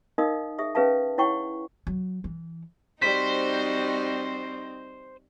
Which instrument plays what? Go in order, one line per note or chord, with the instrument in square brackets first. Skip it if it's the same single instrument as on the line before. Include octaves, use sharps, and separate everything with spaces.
[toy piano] D#4 A#4 D#5 F5 D#6
G#4 E5 D#6
C#4 G#4 B4 E5 F5 A5
E4 C#5 F#5 G5 C#6
[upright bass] F#3
E3
[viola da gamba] G3 F#4 [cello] C4 D#4 [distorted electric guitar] C5 [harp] B6